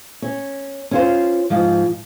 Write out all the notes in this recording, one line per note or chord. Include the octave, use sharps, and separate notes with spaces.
C#4
C#4 F4 C5
G#2 F3